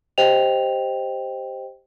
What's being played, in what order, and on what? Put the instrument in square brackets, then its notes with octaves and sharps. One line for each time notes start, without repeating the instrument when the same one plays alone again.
[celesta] G4 C5 D#5 G5 F7